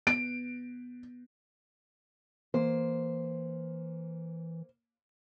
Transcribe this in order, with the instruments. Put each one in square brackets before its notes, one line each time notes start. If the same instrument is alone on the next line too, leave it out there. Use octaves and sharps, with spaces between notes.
[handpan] B3 [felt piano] D7
[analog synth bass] E3 [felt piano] A#3 [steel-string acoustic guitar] C5